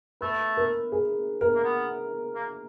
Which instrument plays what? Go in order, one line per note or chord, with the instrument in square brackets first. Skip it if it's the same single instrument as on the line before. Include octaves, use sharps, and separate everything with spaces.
[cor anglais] A3 [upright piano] B4
[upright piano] A#4
G#4
A#4
[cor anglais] A#3
B3
A#3